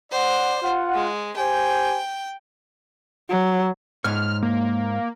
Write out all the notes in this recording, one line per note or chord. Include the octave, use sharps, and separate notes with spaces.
C5 D5 F#5
F4 F#5
G#3
G4 C5 G5 G#5
F#3
G#2 C#5 F6
A#3